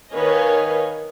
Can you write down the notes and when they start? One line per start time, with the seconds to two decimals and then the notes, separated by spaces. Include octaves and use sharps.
0.12 D#3 B4 C#5 D#5 F5 G#5